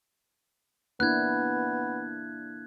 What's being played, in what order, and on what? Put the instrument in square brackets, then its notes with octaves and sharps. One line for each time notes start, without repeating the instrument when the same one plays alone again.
[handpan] A#3 D4 E4 [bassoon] B3 [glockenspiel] F#6 G#6